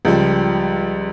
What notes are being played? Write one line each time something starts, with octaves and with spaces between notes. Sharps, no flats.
C#2 F3 G3